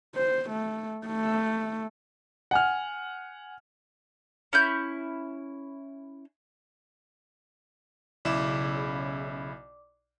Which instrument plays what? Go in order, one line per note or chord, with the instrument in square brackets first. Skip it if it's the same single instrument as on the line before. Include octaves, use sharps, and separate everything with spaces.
[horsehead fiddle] C5
A3
A3
[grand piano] F#5 G#5 F6
[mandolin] C#4 E4 G6
[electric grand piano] B1 E4 E7 [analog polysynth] C#3 [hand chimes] D5 D6